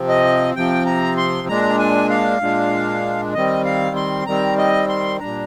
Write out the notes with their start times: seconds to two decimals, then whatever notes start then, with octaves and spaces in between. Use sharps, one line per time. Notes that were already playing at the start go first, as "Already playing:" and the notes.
Already playing: C3 F3 C4
0.09 D#5
0.55 C3 F3 C4 G5
0.86 A#5
1.17 C6
1.48 A#2 G#3 D4 A#5
1.79 G#5
2.10 F5
2.41 A#2 G#3 D4
3.34 D#3 G3 C4 D#5
3.65 F5
3.96 C6
4.26 D#3 G3 C4 A#5
4.58 D#5
4.89 C6
5.20 A#2 G3 D4 A#5